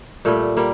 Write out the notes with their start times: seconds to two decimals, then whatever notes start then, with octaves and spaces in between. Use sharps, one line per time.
0.25 A#2 G3 A3
0.57 G3 A#3